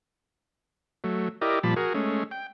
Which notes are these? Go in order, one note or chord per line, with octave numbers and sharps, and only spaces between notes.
F#3 A3
E4 G4 A#4 D5 D#5
A#2 F3 G3 A5 B5
F#4 G#4 A#4
G#3 A3 C#4
G5